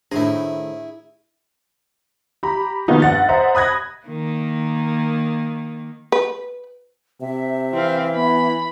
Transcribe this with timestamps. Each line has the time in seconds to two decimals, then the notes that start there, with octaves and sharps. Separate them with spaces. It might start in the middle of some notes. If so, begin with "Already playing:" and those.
0.12 A2 D#3 D4 E4 G#4 C5
2.43 G4 A#5 B5
2.88 D#3 F3 A#3 B3 D#4
3.02 G2 F#5 A6
3.28 C5 D#5 E5 F#5 A#5
3.55 B5 D#6 F#6 G#6 A#6
4.06 D#3 A#3
6.12 B4
7.21 C3 E5
7.74 E3 C4 F5
8.16 B3 B5